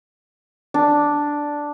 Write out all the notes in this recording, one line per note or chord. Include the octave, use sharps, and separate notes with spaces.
D4